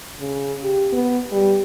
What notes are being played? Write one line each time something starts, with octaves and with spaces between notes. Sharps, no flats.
C#3
G4
B3
G3